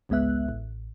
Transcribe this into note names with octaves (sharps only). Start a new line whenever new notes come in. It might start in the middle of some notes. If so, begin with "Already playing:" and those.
G#1 C#2 G#3 B3 E5 F#6
A1